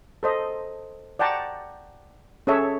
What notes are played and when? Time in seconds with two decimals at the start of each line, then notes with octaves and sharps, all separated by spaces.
0.23 A4 C5 D#5
1.19 D5 F#5 G5 A5 A#5 C#6
2.47 C#4 G#4 A4 C#5 E5